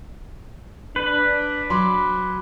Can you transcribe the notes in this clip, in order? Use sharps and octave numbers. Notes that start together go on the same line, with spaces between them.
D4 B4
F#3 B5 C6 D6